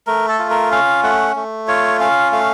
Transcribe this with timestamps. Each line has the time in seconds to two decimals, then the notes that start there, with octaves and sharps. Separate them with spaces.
0.07 A3 A#4
0.28 A4
0.39 F4
0.50 A#4
0.72 C#4 F5
1.03 A3 F#5
1.36 A3
1.68 F4 C#5
2.00 C#4 F5
2.32 A3 F5